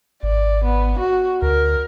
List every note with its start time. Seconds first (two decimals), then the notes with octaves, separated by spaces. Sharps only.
0.23 G#1 D5
0.65 B3
0.99 F#4
1.42 D2 A#4